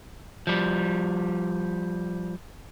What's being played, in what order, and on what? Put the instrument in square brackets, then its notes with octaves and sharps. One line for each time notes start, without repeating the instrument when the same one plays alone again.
[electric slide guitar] F3 G3